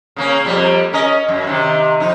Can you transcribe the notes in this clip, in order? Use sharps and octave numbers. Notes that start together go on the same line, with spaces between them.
C#3 A#3 C#4
F2 G3 A#3
C#4 A#4 D#5
F#2
C3 D#3
F2 D#4